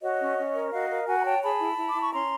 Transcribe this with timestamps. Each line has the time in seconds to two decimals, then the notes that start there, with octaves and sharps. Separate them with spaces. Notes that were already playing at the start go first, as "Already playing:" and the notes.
0.02 F#4 C#5 D#5
0.20 C#4
0.38 C#4
0.55 A#4
0.72 F#4 D#5 F5
0.90 A#4
1.07 F#4 F#5 G#5
1.20 A#5
1.25 C#5 G5 A5
1.42 G#4 A5 B5
1.60 E4
1.77 E4
1.89 D6
1.95 E4
2.01 C#6
2.12 C#4 A#5 C6